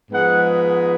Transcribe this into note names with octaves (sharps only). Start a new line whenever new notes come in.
G#2 F3 G#3 B3 F#5